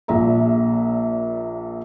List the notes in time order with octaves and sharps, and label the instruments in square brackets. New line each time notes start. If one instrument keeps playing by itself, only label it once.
[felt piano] A#1 A#2 E5 A#5